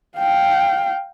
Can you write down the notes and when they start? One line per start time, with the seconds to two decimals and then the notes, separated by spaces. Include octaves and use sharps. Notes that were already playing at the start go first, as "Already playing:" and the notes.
0.18 F5 G5